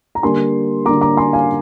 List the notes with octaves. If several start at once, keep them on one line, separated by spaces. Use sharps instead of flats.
A#5
D3 G3 A#3 G#5 C6
D3 G3 A#3 A#5 D6
A#5 D6
G#5 C6
F5 G#5